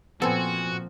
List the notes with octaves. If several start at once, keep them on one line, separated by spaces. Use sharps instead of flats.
A#2 F3 B3 C4 F#4 A4 G#5